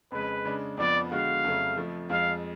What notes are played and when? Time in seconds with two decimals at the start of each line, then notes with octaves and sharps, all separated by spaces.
0.12 F2 C#3 G#3 B4
0.45 C#3 G#3 D4
0.77 F2 F3 B3 D5
1.11 D3 G#3 B3 F#4 F5
1.44 F2 C#3 F#3 A3
1.77 F2 F3 A3
2.09 F2 F3 G#3 F5